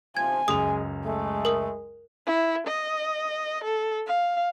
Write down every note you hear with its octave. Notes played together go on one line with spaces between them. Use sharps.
C3 F3 G#5 G#6
C#2 F#2 G#3 D#6 F7
G#3 A3
A#4 D#6
E4
D#5
A4
F5